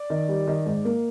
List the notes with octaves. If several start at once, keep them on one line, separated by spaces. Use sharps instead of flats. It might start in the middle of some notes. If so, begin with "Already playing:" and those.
Already playing: D5
D#3
G3
D#3
G#2
A#3